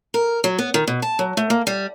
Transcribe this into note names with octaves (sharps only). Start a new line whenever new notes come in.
A#4
F#3
B3
D#3
B2
A5
F#3
A3
A#3
G3